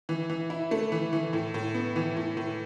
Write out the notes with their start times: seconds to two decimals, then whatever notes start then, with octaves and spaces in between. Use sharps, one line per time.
0.09 E3
0.30 E3
0.50 E4
0.71 A3
0.92 E3
1.13 E3
1.33 A2
1.54 A2
1.75 B3
1.96 E3
2.17 A2
2.37 A2